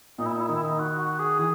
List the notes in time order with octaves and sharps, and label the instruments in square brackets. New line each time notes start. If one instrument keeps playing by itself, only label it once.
[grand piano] A#2 [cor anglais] D#4
[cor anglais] E4
D#4
E4
[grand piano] D#3 [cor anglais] D#4
[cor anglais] E4
D#4
F#4
F#4
G#4
[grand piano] E3 [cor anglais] G#4